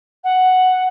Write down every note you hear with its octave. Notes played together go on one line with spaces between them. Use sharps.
F#5